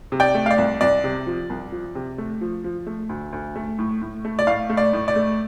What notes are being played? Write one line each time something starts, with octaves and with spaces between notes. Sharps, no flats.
C3
D5 G5
A3
F5
D5
C2
C2 D5
C3
F3
C2
F3
C3
A3
F3
F3
A3
D2
D2
A3
A2
A2
A3
D5
A2 F5
A3
D5
A2
D5
A3